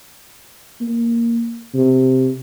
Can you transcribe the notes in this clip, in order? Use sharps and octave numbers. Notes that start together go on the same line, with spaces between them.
A#3
C3